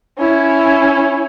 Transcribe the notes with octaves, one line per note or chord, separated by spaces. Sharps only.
C#4 E4